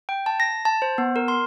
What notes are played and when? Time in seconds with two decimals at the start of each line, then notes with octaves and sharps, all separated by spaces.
0.09 G5
0.26 A5
0.40 A#6
0.65 A5
0.82 C5
0.98 B3
1.16 A#4
1.28 C6